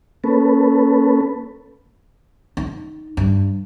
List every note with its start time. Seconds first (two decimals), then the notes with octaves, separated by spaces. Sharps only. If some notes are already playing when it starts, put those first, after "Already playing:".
0.24 A#3 C#4 A4 B4
2.57 D#4
3.17 G2